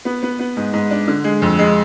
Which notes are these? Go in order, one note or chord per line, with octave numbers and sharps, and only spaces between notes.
B3
B3
B3
G#2
G#2
D4
D3
G#3
F2
G#3